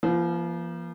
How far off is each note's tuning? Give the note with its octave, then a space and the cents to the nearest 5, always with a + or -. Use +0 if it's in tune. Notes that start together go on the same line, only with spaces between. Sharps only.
F3 -35 A#3 +35